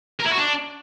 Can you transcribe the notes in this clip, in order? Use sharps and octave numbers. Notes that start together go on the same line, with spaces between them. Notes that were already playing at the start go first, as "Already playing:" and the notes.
A#4
E4
F#4
D4